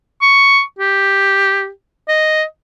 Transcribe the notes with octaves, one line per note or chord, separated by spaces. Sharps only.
C#6
G4
D#5